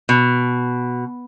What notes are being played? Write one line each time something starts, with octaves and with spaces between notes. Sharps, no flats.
B2